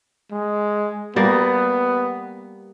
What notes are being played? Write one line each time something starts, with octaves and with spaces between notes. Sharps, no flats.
G#3
G3 A#3 B3